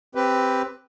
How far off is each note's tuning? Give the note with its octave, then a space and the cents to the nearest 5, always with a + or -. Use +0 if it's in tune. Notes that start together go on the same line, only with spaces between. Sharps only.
C4 +0 G4 +0 B4 +10